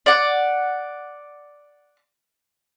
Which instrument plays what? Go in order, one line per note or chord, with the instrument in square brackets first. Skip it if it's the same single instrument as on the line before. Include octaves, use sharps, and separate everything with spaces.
[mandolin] D5 F#5